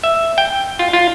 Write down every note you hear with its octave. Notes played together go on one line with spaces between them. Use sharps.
E5
G5
F4
F4